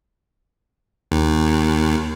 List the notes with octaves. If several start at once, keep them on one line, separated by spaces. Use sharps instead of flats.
D#2